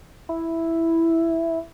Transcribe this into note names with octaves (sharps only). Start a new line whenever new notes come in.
E4